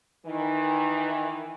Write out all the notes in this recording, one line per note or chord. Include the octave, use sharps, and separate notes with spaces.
D#3 E3